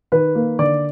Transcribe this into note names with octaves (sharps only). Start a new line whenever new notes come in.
D#3 B4
A#3
D3 D5